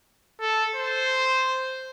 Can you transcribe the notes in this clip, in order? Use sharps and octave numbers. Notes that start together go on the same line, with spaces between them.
A4
C5